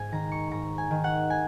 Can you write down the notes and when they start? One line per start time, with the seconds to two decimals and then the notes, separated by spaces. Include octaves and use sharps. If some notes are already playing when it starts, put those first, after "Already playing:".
Already playing: G#2 G#5
0.12 D#3 A#5
0.32 C#6
0.51 G#2 A#5
0.78 G#5
0.91 D#3
1.04 F#5
1.30 G#5